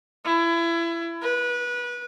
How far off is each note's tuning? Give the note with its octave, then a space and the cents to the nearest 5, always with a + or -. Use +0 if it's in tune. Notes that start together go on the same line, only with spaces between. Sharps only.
E4 +30
B4 -25